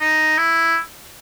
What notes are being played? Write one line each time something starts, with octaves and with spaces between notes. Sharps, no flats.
D#4
E4